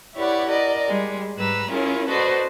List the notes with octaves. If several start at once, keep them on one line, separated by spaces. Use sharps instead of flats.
E4 G4 B4 C#5 D5 F#5
A#4 D5 D#5
G3 G#3
G#2 G3 B4 A#5 E6
C#4 E4 F4 G#4 A#4 C#5
F#4 A4 B4 C5 D5 D#5